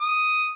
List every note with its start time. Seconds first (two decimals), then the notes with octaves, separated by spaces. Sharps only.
0.01 D#6